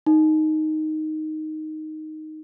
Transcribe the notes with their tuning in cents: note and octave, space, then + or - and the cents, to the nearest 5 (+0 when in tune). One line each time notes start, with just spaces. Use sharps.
D#4 +0